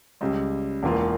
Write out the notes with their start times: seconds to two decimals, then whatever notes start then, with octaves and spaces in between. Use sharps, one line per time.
0.21 C#2 C#3 G3
0.83 E1 E2 E3 A#3 F4